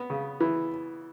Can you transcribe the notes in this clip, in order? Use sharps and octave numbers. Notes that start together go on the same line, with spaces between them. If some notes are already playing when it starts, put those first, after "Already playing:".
Already playing: B3
C#3
E3